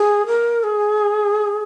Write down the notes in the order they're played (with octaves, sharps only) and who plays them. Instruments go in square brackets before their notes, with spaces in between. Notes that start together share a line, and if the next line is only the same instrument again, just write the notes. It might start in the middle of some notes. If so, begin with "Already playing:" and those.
Already playing: [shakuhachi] G#4
A#4
G#4